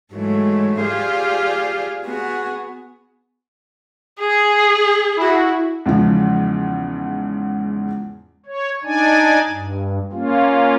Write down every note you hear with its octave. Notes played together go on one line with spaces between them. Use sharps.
G#2 E3 F#3 G#3 A3
F4 G4 G#4 C5 D5 F5
B3 F#4 G#4
G#4
E4 F#4
E2 G#2 C#3 F3
C#5
D4 D#4 D5 G#5
G2
A#3 C#4 F4